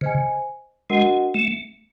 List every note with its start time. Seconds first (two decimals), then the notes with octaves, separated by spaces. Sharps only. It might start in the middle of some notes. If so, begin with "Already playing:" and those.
0.01 C#3 C5 D#5 G#5
0.90 G#3 D4 F#4 A#4 D#5 F#5
1.34 A3